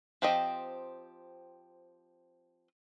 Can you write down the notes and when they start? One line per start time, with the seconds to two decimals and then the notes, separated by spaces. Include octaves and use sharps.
0.22 F3 C4 G4 D#5